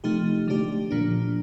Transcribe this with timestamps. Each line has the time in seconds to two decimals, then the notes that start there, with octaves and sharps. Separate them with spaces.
0.04 C3 F3 A3 D#4 G4
0.47 D3 A3 D4 G4
0.91 A#2 F3 A#3 D4